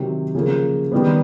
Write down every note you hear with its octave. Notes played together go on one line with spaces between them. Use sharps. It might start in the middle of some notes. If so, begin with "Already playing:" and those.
Already playing: C3 D#3 F#3
C#3 F3 A#3
D#3 G3 B3